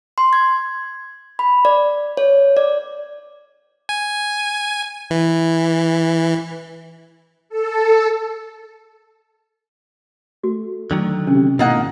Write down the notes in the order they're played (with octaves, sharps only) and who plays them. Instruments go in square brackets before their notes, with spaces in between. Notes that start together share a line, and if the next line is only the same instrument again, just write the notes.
[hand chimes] C6
G#6
B5
D5
C#5
D5
[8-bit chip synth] G#5
E3
[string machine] A4
[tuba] A3 [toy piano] F#4
[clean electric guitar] D3 D#3 F#3
[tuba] C3 [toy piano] C#4
[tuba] G#1 [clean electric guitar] B2 [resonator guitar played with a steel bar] A#3 D#4 F#5 [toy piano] E4 D#5